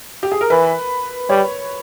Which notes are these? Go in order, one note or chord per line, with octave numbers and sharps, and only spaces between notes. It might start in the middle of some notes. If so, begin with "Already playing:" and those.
G4
G#4
A#4
E3 B4
G3 C#5